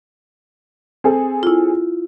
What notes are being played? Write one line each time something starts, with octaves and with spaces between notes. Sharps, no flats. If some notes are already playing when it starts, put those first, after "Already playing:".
C4 G#4 A4
E4 F4